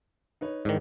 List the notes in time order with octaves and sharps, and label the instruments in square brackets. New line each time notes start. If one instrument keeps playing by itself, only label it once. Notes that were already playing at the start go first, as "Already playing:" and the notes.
[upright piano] D#4 B4 C#5
[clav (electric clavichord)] G#2 D#3 [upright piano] E3 D4